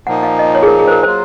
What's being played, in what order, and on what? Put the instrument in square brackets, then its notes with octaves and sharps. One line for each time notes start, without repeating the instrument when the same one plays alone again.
[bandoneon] A#2 F3 A#3 D#4 [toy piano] F#5
[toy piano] F5
D#5
C#5
G#4
A#4
G#4
C5
A#4
[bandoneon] F#3 A#3 F4 [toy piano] C5